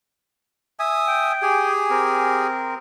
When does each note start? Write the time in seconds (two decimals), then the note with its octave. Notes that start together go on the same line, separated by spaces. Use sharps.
0.79 E5 G#5 D#6
1.07 G5
1.42 G4 G#4 G#5
1.90 C4 A#4